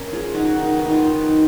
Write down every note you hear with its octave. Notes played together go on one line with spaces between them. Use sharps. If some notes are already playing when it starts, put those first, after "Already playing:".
Already playing: C#4 A#4
F3 F4 G#4
F#3 D#4 F#4
D#3
D#4
B3
D#4
F4
D#3
F#3